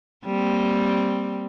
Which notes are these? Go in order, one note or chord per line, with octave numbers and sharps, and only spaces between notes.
G3 A#3 C4